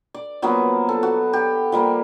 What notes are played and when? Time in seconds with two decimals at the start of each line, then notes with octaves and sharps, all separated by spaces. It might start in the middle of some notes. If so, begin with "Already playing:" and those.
0.14 D5
0.42 F3 F#3 A#3 B3
0.89 A4
1.03 F#4
1.33 G4
1.72 F3 G3 A#3